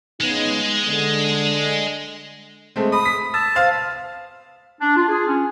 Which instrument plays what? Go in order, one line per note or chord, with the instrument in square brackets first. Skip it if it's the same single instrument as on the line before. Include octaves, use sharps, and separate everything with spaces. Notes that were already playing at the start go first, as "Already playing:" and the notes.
[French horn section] C#3 B3 D#4 [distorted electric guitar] G#3
[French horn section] D3
[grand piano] G#3 A3 C4
[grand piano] B5 [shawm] D#6
[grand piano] B6
[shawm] A5 [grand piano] E6
[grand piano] C5 F5 F6
[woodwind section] D4
F4
G#4
C#4